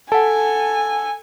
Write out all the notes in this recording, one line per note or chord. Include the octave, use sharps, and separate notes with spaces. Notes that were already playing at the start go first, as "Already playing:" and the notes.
A4 F#5 G#5 A5